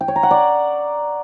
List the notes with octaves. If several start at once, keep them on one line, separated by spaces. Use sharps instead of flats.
G5
C#5
A#5
F#5
D5